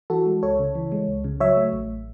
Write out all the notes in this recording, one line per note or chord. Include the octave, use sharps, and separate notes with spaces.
E3 F#4 A4
G#3
C#2 A4 C#5
C#3
E3
G#3
C#2
C#3
F#3 C#5 E5
A3
A1